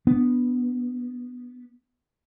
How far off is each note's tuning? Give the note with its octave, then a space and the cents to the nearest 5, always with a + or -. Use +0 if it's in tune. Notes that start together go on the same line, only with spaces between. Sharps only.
B3 +0 D4 +0